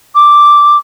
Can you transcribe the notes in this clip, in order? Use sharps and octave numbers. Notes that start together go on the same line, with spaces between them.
D6